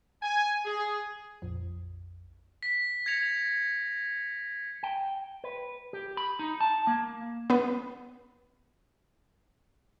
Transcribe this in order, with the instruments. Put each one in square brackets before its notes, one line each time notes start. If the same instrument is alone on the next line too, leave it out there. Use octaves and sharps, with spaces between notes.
[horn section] G#5
G#4
[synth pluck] A#1 F2
[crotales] B6
G#6 A#6 C#7 F7
[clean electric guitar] G5
B4
G4
B5
D#4
A5
A#3
[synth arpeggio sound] B3 B4